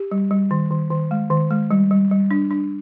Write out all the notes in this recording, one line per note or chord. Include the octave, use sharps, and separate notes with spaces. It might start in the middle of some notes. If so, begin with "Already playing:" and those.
Already playing: G4
G3
G3
D#3
D#3
D#3
G#3
D#3
G#3
G3
G3
G3
D4
D4